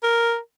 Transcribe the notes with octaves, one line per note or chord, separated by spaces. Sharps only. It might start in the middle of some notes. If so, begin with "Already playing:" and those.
A#4